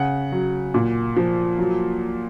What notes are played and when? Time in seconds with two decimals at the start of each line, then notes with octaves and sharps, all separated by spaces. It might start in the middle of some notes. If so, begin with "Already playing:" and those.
Already playing: C#3 F#5
0.32 F#3
0.74 A#2
1.17 F3
1.59 F#3